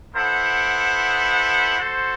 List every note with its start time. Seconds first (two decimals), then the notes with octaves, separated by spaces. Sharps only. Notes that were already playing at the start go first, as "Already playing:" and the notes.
0.15 B3 E4 A4 C5 F#5
1.78 F#4 A4 C5